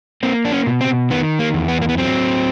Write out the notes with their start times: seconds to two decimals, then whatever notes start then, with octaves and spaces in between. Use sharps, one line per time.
0.23 A#3 C4
0.45 D4
0.52 C#4
0.66 B2
0.81 C4
1.10 D#3 B3
1.39 A#3
1.54 E2
1.68 B3
1.82 A#3
1.89 B3
1.98 F#3 C4